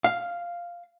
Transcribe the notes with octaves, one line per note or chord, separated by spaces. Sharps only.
F5